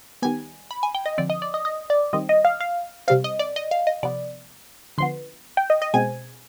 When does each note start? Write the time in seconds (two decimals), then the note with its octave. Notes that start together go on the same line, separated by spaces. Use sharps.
0.22 D#3 G3 B3 G#5
0.71 B5
0.83 G#5
0.95 G5
1.06 D#5
1.18 D3 F3 C4 D5
1.30 D#5
1.42 D5
1.54 D#5
1.65 D#5
1.90 D5
2.13 D#3 G3 C4 D#5
2.29 D#5
2.45 F5
2.61 F5
3.08 C3 G3 C4 F5
3.24 D#5
3.39 D5
3.56 D#5
3.71 F5
3.87 D#5
4.03 C3 F3 B3 D5
4.98 D3 F3 B3 C6
5.57 G5
5.70 D#5
5.82 D#5
5.94 B2 G#3 C4 G#5